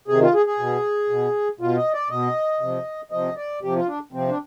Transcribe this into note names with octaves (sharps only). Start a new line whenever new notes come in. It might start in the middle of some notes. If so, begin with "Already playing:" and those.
C3 G#4
D#3
F4
G#4
G#4
B2
B2
B2 F4
D#5
D5
B2 D#5
C3 F3
C3 F3 D#5
D5
C3 F3 G4
F4
D4
C3 F3 C4
D4